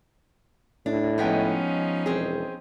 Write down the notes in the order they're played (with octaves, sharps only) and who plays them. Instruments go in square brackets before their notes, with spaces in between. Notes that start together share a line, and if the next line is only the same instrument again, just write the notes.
[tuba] A2 [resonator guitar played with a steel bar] D4
[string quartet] F3 C#4 D#4 [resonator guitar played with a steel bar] G#3 B3 G5
[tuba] E1 [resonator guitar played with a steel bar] C4 G#4